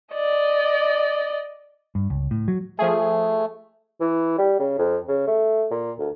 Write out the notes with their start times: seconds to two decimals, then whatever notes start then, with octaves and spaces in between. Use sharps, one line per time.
0.13 D5 D#5
1.95 G2
2.10 C#2
2.31 A2
2.48 F#3
2.79 F3 A3 G#4
4.01 E3
4.38 G3
4.59 C#3
4.78 F2
5.08 C#3
5.28 A3
5.71 A#2
5.99 D2